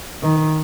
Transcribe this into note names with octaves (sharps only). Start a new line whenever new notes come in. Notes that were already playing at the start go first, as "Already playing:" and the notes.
D#3